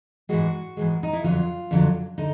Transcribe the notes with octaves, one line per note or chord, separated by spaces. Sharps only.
G#2 E3 G#3 F#4
G#2 E3 G#3
D#4
E4
F2 D3 F#3 F4
F2 D3 F#3
D3 D#4